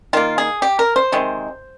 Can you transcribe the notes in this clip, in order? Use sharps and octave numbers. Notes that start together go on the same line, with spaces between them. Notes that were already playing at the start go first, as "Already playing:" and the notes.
D#3 A#3 F4
G#4
G4
A#4
C5
C3 D#3 G#3